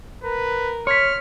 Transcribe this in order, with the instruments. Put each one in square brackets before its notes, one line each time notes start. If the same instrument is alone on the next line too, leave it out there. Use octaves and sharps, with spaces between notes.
[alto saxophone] A#4 [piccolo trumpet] B4
[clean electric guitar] C#5 [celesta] C6 G#6 B6 [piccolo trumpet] F6